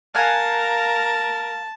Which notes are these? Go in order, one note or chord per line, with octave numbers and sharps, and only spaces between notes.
A#4 F5 F#5 G#5 A5